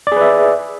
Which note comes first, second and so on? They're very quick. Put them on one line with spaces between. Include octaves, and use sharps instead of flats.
D5 G#4 B4 E5